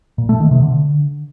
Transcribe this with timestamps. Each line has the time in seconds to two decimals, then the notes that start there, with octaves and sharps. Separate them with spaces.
0.18 A#2
0.29 A3
0.40 D#3
0.51 C3
0.62 D3